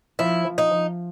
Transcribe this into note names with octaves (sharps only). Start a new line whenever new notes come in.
F3 E4
F3
D#4
F3